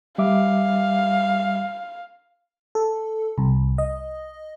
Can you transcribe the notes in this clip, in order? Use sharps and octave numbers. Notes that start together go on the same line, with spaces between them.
G3 E5 F5 D6
A4
C2
D#5